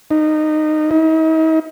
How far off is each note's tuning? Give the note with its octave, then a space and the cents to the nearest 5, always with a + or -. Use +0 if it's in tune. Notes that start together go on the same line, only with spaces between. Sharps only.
D#4 -15
D#4 +45